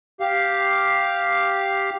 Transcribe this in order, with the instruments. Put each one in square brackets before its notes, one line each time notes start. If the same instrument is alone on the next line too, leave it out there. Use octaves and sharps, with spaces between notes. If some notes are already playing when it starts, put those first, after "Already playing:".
[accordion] G4 F5